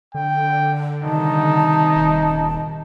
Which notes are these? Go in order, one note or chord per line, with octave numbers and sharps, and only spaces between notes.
D3 G5
C3 D#3 G3 D#4 A5
D#1